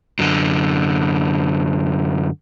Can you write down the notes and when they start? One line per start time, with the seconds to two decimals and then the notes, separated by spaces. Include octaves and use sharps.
0.19 F#2 D3